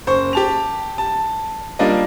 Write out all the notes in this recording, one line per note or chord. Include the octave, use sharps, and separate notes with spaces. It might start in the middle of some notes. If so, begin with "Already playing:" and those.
F#1 C5 C#6
G4 A5 F7
A5
G3 A#3 D4 F4 D#5